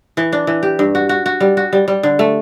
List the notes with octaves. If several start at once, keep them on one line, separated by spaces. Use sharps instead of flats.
E3
D4
E3
G4
G2
F#4
F#4
F#4
G3
F#4
G3
G3
D3
A3